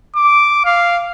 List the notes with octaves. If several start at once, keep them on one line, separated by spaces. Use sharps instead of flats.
D6
F5